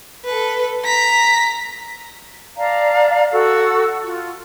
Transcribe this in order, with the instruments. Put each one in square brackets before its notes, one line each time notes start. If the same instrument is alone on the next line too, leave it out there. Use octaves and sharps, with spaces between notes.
[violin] A4 B4
A#5 B6
[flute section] D5 F5 A5 A#5
F#4 A4 E6
F4